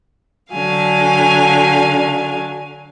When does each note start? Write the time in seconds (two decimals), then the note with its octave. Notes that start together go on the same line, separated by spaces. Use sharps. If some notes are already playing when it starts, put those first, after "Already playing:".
0.51 D3 F#3 F5 G#5